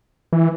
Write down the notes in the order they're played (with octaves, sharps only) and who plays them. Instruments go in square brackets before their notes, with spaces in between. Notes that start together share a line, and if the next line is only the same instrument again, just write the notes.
[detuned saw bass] E3